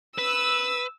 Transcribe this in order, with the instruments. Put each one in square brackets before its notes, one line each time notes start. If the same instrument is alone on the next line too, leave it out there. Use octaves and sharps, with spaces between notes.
[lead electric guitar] B4 [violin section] E6